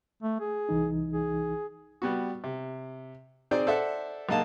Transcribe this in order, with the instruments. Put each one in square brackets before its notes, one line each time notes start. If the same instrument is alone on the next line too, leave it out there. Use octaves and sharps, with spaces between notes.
[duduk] A3
G#4
[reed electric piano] C2 E3 D#4
[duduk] G#4
[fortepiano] G3 B3 F#4
C3
C4 D#4 G#4 C5 D5
A4 C5 D5 E5 F#5
B1 G#3 A#3 D#5 F5 A5